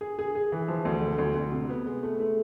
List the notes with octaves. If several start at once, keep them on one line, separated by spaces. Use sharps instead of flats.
G#4
G#4
G#4
E3
F3
D2
D3
D2
D2
C3
B3
G#3
A3
A3